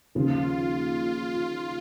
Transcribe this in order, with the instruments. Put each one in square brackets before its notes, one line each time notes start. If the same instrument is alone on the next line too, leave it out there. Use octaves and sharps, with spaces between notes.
[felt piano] D#2 C#3 F3 [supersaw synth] F4